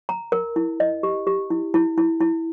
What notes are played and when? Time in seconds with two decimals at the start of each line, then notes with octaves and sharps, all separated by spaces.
0.09 A#5
0.32 A#4
0.56 E4
0.80 D#5
1.03 G4
1.27 G4
1.50 E4
1.74 E4
1.98 E4
2.21 E4